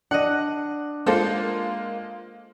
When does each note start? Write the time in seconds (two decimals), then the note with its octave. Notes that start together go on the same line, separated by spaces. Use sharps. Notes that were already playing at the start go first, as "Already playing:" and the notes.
0.11 D4 D#5 F#5
1.06 G#3 A#3 F4 A4 C5